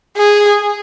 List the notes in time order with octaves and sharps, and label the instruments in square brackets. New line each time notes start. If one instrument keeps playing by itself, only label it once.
[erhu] G#4